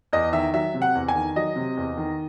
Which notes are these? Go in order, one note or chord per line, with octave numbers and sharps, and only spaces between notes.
E2 D#5
D#3 E5
F#3 E5
C3
F#5
E2
G#5
D#3
F#3 D#5
C3
E2
D#3